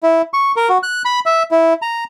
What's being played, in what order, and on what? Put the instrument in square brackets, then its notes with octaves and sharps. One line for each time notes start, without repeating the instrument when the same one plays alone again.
[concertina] E4
C#6
A#4
F#4
F#6
B5
E5
E4
A#5